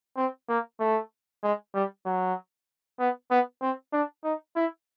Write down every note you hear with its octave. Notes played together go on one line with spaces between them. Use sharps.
C4
A#3
A3
G#3
G3
F#3
B3
B3
C4
D4
D#4
E4